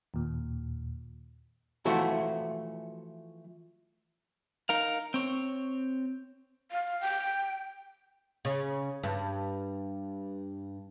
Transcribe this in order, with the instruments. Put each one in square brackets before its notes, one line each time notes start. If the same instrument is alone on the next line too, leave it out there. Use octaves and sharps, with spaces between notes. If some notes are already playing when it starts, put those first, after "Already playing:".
[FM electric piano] D#2 A#2
[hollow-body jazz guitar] E3 F3 A3 E4 F#4
[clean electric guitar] D#4 A#4 F5
C4 C#5
[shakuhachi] F5
G5
[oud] C#3
G2